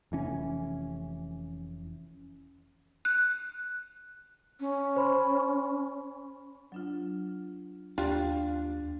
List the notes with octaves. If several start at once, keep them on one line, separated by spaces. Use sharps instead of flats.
F1 E3 C#4
F#6
C#4
C5 B5 C6
F#3 D4 F4
D#2 G3 D4 F4 F5 F#6